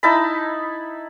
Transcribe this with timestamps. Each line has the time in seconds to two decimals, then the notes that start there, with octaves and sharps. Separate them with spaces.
0.03 D#4 E4 A5 B5